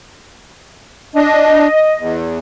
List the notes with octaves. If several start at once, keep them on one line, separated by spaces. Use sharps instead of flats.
D4 D#5
E2